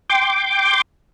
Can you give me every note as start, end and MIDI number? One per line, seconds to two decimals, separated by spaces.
0.10 0.81 79
0.10 0.81 84
0.10 0.81 86